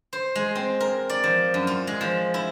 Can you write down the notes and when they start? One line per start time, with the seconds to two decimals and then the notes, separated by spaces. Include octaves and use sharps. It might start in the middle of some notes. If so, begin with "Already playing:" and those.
0.13 C5
0.35 G#3
0.55 C4
0.80 A#4
1.09 D5
1.24 F3
1.54 F#2
1.67 F4
1.87 G#3
2.01 F3
2.34 E4